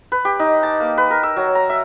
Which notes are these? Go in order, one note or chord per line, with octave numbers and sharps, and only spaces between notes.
B4
G4
D#4
A5
A#3
B4
A#4
E6
F#3
A#5
E5